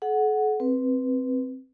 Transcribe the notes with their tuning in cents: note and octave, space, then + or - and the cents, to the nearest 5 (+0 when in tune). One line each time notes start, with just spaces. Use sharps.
A4 -45 F#5 +0
C4 +0 B4 -5